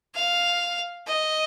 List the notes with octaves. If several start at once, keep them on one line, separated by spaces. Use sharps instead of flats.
F5
D#5